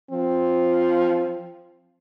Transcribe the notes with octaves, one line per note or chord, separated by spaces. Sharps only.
F3 C4